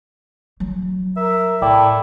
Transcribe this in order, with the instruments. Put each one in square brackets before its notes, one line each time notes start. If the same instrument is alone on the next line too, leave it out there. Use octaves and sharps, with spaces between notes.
[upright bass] F#3 E4
[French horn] A#4 [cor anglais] E5
[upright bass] A2 C3 [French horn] A3 [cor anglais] E4 [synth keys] D5 G5 D6